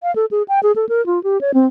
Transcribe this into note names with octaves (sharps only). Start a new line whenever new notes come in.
F5
A4
G#4
G5
G#4
A4
A#4
F4
G4
C#5
C4